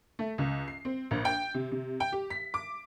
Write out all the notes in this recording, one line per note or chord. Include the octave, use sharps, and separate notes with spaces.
A3
C#2
C7
C4
A#1
G5
C3
C3
G5
G4
B6
D6